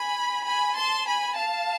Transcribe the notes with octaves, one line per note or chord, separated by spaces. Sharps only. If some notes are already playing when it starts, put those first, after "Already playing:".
Already playing: G#5 B5
G#5 B5
A5 C6
G#5 B5
F5 A5